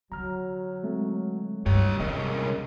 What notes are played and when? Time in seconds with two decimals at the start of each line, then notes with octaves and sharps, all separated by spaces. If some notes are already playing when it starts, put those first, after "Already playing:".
0.12 D3 F#3 A#5 F6
0.83 G#3 A3 C4
1.66 G2 G4 C#5
2.00 C2 G#3 A#3 C#4 G#4 A#4 D#5